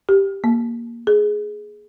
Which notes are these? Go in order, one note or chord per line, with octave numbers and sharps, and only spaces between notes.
G4
A#3
G#4